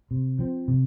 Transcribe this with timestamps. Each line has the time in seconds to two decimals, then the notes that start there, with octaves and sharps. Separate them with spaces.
0.11 C3
0.39 F3 C4
0.68 C3